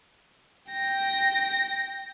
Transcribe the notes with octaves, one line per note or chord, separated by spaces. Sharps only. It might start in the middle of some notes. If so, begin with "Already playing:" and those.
G5 A#6